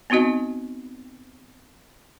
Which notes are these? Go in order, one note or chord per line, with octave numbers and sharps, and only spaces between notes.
B3 C4 D#4 F#4 D#5